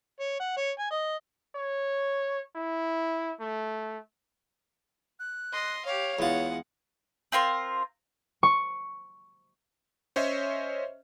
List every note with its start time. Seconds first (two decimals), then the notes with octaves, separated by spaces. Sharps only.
0.20 C#5
0.40 F#5
0.57 C#5
0.79 G#5
0.91 D#5
1.56 C#5
2.56 E4
3.40 A3
5.20 F#6
5.53 D#5 C6
5.85 G4 C#5 F5
6.19 E2 G#3 F4 F#5
7.32 C4 F4 A#4 C6
8.43 C#6
10.16 C#4 C5 C#5 D#5 E5